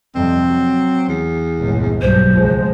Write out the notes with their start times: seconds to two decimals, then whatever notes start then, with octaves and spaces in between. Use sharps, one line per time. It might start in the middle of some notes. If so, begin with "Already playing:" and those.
0.15 F2 C3 G3 C4
0.45 F#3
1.09 E2
1.58 G1 C#2 A#2
2.01 B1 G2 C5
2.34 C#2 F#2 F3 G#3